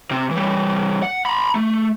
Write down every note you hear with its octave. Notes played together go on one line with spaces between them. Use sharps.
C3 C4
E3 G3
F#5
A#5 B5
A3